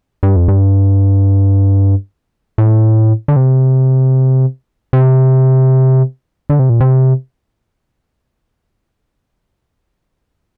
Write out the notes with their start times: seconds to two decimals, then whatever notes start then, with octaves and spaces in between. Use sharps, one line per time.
0.23 G2
0.36 F2
0.48 G2
2.58 A2
3.28 D3
3.36 C3
4.93 C3
6.50 D3
6.59 C3
6.70 A#2
6.80 C3